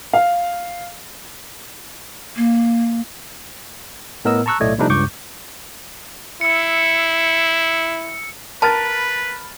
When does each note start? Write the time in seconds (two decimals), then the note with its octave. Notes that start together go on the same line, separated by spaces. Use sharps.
0.13 F5
2.37 A#3
4.25 A2 B3 A#4 D#5 E6
4.46 A5 A#5 C#6 E6 F#6
4.61 B1 A2 A3 D5 D#5 G#6
4.78 C3 F3 G3 A3 D4 D#4
4.90 C#2 G2 C#6 D6 G6
6.41 E4 E6 C#7
8.62 F#4 A#4 B4 A5 B5 F6 A6